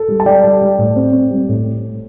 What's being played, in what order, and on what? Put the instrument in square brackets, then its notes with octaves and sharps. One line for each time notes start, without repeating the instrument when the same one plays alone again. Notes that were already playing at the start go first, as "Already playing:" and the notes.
Already playing: [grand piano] A4
G3
A5
G3 D5 G5
G3
G3
A2
C4
C4
G3
A2